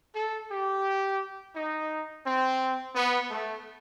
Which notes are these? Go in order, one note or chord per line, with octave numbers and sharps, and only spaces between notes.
A4
G4
D#4
C4
B3
A3